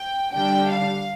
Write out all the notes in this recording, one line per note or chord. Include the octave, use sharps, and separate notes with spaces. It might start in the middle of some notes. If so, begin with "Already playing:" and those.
Already playing: G5
D3 G3 D4 G5
F5